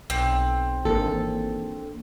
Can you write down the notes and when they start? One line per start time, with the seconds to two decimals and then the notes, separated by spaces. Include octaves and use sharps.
0.10 B1 C4
0.85 G#1 E3 A#3 D4 A4